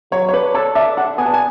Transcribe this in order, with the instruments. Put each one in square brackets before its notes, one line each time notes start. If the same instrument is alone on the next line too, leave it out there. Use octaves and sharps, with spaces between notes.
[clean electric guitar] F#3 [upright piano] C#5
[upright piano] C#5
[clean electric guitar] D4 [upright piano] B4
[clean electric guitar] A4 [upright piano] C#5
[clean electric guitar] D4 [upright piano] E5
[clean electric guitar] D4 [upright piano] F#5
[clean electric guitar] B3 [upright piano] G#5
[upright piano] A5
G#5